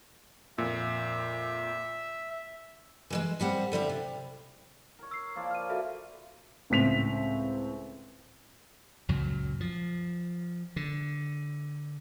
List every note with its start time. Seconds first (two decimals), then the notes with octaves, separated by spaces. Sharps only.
0.58 F2 A#2 E5
3.10 E3 F#3 G#3
3.40 D#2 G3 C4 F#5
3.72 D3 G3 C4 E4
3.89 C3
4.99 A#4 C#5
5.11 E6 C7
5.36 F3 A#3 D5
5.51 F6 D#7
5.69 F#4 A4 E5
6.70 C#2 A2 C4 B6 F7
9.09 C#2 F#2 A#2 F#3
9.60 F3
10.76 D3